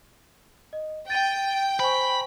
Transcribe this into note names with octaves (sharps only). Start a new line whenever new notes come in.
D#5
G5 A6 D#7
C5 G#5 B5 C#6